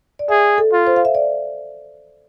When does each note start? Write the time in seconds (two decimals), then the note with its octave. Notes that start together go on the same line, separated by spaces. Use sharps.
0.19 D5
0.29 G#4 E5
0.58 A4
0.72 F4
0.87 C5
0.96 F5
1.05 E5
1.15 D5